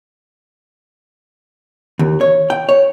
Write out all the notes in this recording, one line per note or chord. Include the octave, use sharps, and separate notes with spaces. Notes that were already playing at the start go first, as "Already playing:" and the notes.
D#2
C#5
G5
C#5